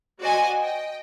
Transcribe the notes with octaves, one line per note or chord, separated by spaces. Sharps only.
F#4 C5 D5 D#5 F#5 G#5
D#5 G5